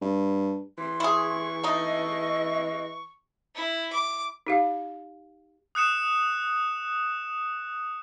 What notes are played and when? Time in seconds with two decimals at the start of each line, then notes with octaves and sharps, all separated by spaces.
0.01 G2
0.78 E3 C6
1.00 E4 G#4 C#6
1.63 A3 D#4 D#5
3.55 E4
3.93 D6
4.47 D#4 G4 F5
5.75 D#6 F#6 C#7 E7